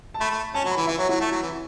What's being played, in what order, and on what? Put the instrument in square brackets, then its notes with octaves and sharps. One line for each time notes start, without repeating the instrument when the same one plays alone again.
[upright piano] A5
[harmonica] A3 [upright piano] B5
[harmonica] A3
[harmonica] C#4 [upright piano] A5
[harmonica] F#3
[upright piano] B5
[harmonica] E3
[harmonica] E3 [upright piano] E5
[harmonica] F#3 [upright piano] C#5
[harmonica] F#3 [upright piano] E4
[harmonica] A3
F#3
E3